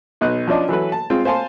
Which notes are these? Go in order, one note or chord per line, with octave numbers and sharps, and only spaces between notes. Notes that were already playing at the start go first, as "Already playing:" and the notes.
B1 D#5 F#6
F3 C#4 D4 D#5
E3 F#3 A4 B4
A5
G#3 C4 F4
C5 F5 G#5 A5 C6